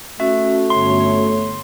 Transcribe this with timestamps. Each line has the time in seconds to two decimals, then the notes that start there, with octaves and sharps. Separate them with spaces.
0.20 A3 C#4 F#4 E5
0.70 G1 C#5 C6